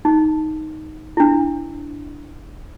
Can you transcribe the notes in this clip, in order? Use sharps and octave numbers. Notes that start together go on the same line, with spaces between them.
D#4
D4 E4